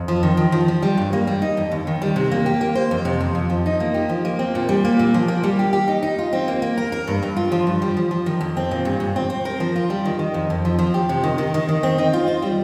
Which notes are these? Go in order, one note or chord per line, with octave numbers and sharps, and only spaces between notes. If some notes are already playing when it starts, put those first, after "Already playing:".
Already playing: F2
F3
D#3
D#3
F3
F3
G3
G2
A#3
G3
D#4
F2
D#2
D#3
G3
C3
A#3
G4
A#3
C5
F2
C3
F2
F2
F3
D#4
A#3
G4
F3
A#3
C4
A#2
G3
A#3
A#2
F3
A#3
G3
G4
G4
D#4
D#4
F4
C4
A#3
A#3
A#4
A#4
G2
G2
F4
F3
G2
G3
F3
F3
D#3
F2
C4
A#2
G2
G2
C4
C4
A#4
F3
F4
G3
D#3
D#3
F2
F2
F3
F3
G4
C3
D#3
D#3
D#3
D#3
C4
D#4
F4
C5
G3